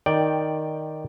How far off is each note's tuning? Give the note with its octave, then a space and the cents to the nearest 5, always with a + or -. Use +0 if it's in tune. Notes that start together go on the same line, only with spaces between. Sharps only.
D#3 +0 D5 +0 G5 +0